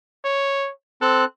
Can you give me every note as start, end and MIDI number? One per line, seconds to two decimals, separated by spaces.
0.25 0.71 73
1.02 1.25 60
1.02 1.25 69
1.02 1.25 90